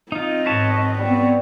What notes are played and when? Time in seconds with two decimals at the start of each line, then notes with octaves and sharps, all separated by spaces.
0.12 C4 D#4 F4 D#5
0.46 G#2 B4 C#5 A5
0.98 G3 B3 C4